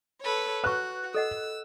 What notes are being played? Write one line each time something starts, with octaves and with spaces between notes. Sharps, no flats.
A4 B4 C#5
F#4 B4 C#6 F#6
A4 D#5 F#5 E6